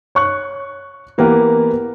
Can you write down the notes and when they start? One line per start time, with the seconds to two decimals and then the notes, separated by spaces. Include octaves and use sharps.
0.15 C#5 C#6 F#6
1.18 E3 A#3 B3 G4 A#4